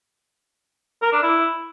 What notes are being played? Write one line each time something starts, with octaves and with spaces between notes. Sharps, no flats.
A#4
D4
E4